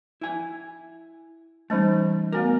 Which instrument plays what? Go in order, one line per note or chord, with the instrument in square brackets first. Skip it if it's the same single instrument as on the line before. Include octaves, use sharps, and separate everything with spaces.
[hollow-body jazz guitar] E4 G#5
[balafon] E3 G3 C#4 [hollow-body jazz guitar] A3 D#4
[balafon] A3 B3 F#4 [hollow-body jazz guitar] A#4